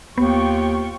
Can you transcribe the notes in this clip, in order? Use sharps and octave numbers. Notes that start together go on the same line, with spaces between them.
D#2 B3 F4 G5 C#6